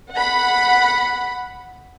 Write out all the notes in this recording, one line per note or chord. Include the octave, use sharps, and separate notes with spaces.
F#5 B5